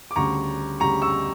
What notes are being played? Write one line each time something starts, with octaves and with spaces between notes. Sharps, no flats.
D6
D2 C#3 G3 A#5 C#6
D2 C#3 G3 A#5 C#6
C#6 E6